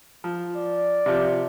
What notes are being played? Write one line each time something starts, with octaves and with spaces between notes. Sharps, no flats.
F3
D5
C3 F3